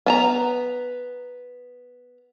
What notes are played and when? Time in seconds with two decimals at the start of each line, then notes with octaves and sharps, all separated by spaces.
0.06 B3 A5 A#5